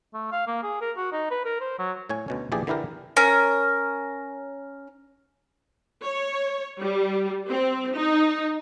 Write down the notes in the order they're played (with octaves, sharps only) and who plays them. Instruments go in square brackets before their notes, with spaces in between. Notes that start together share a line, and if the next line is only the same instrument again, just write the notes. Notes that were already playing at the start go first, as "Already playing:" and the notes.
[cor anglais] A3
F5
A#3
G#4
A#4
F#4
D#4
B4
A#4
C5
F#3
[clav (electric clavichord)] A2 C#5 G#5
D2 B2 C#4
A#1 E3 G4 G#4 D5
D3 E3 E4 G4 A#4
[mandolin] C#4 A#4
[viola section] C#5
G3
C4
D#4